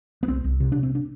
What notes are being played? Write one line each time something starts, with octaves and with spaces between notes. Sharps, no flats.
B3
C2 C4
C2
C3
C3 D4
C4
D4